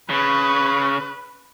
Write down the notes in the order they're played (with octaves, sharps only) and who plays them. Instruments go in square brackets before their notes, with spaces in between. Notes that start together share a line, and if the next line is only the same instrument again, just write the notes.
[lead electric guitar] C#3 [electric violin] B4 [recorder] C#6